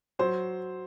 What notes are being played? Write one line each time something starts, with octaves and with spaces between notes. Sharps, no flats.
F#3 C5